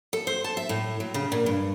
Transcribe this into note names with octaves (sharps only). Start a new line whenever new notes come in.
A4
C5
A5
E5
A2
F#3
C#3
A#2
G2